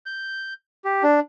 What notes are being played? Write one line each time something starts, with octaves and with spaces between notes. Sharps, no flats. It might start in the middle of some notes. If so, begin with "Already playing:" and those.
G6
G4
D4